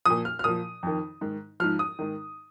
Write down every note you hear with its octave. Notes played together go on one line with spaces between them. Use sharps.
A#2 F3 D#6
F6
F6
A#2 F3 D#6
F2 D#3
G#2 D#3
G#2 F3 F6
D#6
G#2 D#3